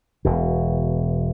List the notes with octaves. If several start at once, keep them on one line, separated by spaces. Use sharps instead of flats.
E1 B2